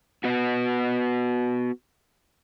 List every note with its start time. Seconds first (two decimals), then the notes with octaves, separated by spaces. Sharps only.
0.24 B3 F#4